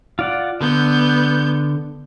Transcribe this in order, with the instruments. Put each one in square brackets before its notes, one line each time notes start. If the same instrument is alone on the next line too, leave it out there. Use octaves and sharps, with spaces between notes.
[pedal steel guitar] F4 D5 F#5
[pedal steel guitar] D3 [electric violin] B3 G6